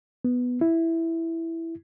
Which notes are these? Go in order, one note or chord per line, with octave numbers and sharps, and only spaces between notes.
B3
E4